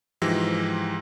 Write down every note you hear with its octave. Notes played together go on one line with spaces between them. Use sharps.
G#2 E3 F3 G4 E6 A#6